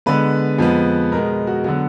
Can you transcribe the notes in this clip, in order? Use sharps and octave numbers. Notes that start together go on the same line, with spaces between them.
D3 G#3 B3 B4
F2 F3 G#3 B3
B2 G#3 B3 A#4
F#4
D3 F#3 B3 F#4